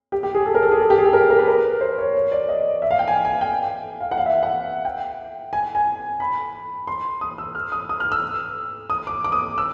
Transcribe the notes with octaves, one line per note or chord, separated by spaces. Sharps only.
G4
G4
G#4
A4
A#4
A4
G#4
A4
G4
G#4
A4
A#4
A#4
B4
A#4
C5
C#5
C#5
D5
D#5
E5
F5
G5
G#5
G#5
G5
F5
F#5
F5
E5
F5
F#5
G5
G#5
G#5
B5
C6
D#6
E6
F6
D#6
D#6
F6
E6
D#6
D6
D6
D#6
E6